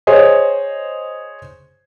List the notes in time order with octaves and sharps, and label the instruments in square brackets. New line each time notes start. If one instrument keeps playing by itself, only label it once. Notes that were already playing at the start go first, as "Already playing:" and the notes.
[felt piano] G#4 C5 C#5 D#5